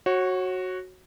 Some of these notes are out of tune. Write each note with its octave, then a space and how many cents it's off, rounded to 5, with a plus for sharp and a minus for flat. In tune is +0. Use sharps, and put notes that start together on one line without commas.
F#4 +0 C#5 -30